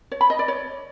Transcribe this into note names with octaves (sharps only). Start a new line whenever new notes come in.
C#5
B5
D#5
D5
C#5